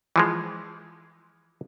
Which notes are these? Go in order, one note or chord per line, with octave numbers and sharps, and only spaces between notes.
E3 F3 G#3